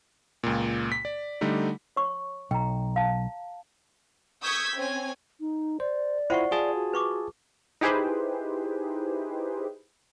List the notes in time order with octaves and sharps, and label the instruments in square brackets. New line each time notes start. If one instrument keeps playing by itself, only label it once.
[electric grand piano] C#2 A#2
B6
D5
D3 G3 A3 D#4
[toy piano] C#5 C#6
[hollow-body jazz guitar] B1 [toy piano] G5 A#5
[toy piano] F5 A5
[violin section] C#6 D#6 E6 G6 G#6 B6
C4 C#4 G#5
[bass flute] D#4
[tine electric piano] C5 [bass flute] D5
[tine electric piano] E4 F4 [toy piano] C5 F#5 C#6
[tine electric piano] F4 G#4 A5
[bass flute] F#4
[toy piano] B4 C#6 D6
[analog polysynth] D#4 E4 G4 G#4 B4 C5